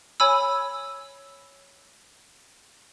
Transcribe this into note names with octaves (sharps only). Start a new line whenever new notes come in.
C#5 G#5 B5 E6